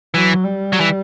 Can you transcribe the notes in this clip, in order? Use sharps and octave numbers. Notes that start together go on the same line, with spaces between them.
E3 F#3
G3
F#3
E3